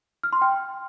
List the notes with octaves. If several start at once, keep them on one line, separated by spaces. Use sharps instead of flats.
F6
C6
G5